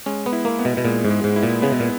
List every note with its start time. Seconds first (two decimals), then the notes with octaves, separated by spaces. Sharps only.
0.06 G#3 C#4
0.26 B3
0.33 E4
0.45 A#3
0.59 B3
0.65 B2
0.77 B2
0.85 A#2 G#3
1.05 G#2
1.10 G#3
1.24 G#2
1.36 E4
1.43 A#2
1.62 C#3 B3
1.72 B2
1.80 A#2